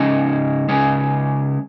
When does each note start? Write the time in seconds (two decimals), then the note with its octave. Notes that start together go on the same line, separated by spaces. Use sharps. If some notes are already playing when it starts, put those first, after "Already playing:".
Already playing: C#3 G#3 C#4 D#4
0.69 C#3 G#3 C#4